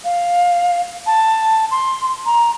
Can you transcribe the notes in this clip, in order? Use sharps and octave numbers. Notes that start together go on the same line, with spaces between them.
F5
A5
C6
A#5